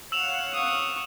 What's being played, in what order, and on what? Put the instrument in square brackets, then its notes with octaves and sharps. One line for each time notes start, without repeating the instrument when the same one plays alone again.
[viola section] C#5 F5 F#5 [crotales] E6 E7 F7
[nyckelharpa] C#6 D#6